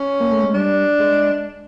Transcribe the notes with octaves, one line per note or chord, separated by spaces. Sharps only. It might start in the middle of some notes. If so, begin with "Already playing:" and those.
Already playing: C#4
A#3
A3
G#3
G3 D4
G#3